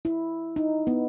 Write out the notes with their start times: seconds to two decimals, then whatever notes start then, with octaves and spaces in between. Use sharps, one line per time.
0.05 E4
0.56 D#4
0.87 B3